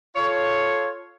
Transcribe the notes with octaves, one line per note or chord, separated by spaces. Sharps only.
F4 A4 C#5